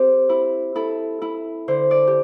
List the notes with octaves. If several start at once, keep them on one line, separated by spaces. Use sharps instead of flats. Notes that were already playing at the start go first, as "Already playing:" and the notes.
Already playing: C4 G4 A4 C5
E4
E4 A4
E4
D3 C5
D5
G4